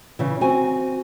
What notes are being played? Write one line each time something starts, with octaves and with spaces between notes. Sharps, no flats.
C#3 E3
C4 F#4 G#5